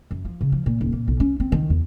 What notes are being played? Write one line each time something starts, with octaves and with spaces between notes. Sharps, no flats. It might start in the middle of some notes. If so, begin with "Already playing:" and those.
F#2
F3
C#3
F3
A#2
D#1
A#2
B1
C#4
C4
D#3
E2